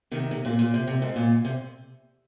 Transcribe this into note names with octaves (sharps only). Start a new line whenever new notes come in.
C3 D#3
C3
A#2
A#2
C3
C3
G#2
A#2
C3